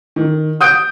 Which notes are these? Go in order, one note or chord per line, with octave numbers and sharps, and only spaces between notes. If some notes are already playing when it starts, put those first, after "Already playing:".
D#3
D#6 G6 D7